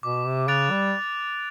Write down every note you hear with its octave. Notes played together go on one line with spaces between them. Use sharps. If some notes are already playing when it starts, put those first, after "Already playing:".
B2 D6
C3
C#3 F#6 A6 D7 F7
G3